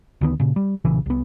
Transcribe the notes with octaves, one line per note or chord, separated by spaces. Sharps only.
D2 D#3 B3
A#2 C#3
G3
B1 A#2 C#3 E3
C2 B3